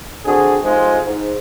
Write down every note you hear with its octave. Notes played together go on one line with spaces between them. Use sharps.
D3 C4 F#4 G#4
F2 G#3 D#4 F4 G4 C5
G#2